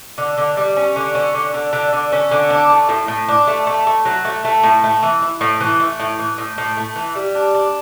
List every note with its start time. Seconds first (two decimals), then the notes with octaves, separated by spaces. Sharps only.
0.18 D3
0.38 D3
0.57 G3
0.77 C#4
0.96 D3
1.15 C#4
1.35 D3
1.54 D3
1.73 D3
1.93 D3
2.12 C#4
2.31 D3
2.50 D4
2.70 A3
2.89 A2
3.08 A2
3.28 D4
3.47 A3
3.67 A3
3.87 A3
4.05 F#3
4.25 A3
4.45 A3
4.63 A2
4.84 A3
5.03 E3
5.22 E4
5.41 A2
5.60 E3
5.80 A3
6.00 A2
6.19 E3
6.38 A2
6.58 A2
6.77 A3
6.96 E3
7.15 G3
7.35 D4
7.54 D4